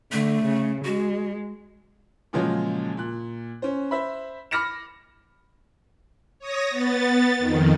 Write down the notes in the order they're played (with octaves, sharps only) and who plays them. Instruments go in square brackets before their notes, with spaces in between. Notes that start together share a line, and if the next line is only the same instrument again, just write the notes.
[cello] D3 [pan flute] A3
[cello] C#3
[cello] G#3 [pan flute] F#4
[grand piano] A#2 C#3 F3 F#3 G#3
A#2 F#6
C#4 C5
C5 E5 B5
B5 D6 F6 A#6 C#7 E7
[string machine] C#5 D#6 A#6
B3 A6
F2 D#3